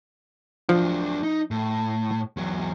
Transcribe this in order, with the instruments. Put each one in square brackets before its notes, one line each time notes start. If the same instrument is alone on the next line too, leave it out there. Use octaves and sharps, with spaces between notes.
[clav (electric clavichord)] F3 [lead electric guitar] F#3 D4
[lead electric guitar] D#4
A2
E2 F#3